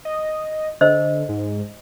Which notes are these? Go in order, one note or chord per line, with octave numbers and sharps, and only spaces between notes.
D#5
D3 C5 D#5 E6
G#2